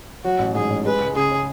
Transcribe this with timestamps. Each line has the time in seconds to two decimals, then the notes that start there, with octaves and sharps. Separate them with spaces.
0.24 F#3 F#4
0.39 A1
0.55 G#2 G#4
0.70 A1
0.85 G#3 B4
1.00 C#2
1.16 C#3 G#4
1.31 C#4